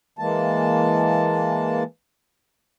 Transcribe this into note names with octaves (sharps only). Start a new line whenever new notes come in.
E3 G#3 A#3 A5